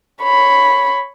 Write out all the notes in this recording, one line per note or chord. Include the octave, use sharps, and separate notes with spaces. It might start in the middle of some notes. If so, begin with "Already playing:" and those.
C#5 B5